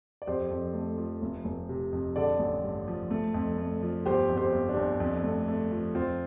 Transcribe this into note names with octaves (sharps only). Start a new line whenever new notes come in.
D5
F2 G4 C5
F2
A3
F3
F1
F1
C3
F2
D3 A4 D5
A1
G2
F3
A3
F2
A3
F3
G1 G4 C5
F2
G4 C5
G1
D4 G4
G1
F2
A3
A3
F3
F2 C4 F4